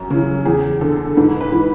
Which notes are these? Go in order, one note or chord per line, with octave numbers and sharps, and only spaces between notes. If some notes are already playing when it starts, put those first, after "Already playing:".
Already playing: F#2
C#3 E3
E2 G#4
D3 A4
G#2 B4
B4
E3